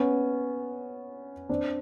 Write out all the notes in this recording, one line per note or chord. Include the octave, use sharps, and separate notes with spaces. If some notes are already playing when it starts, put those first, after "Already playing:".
Already playing: B3 C#4
C4 D4